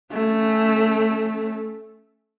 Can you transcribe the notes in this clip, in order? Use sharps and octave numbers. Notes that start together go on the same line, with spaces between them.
A3 C#4